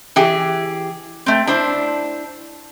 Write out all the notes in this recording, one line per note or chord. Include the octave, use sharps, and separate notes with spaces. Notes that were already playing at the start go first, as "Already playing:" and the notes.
E3 G4 G#4
A3 C4
D4 E4 C5